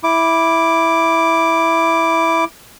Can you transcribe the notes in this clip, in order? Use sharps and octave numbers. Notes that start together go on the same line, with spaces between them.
E4 D6